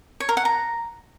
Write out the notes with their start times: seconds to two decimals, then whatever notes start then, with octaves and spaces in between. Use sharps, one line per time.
0.20 C#5
0.29 A#4
0.37 F#5
0.45 A#5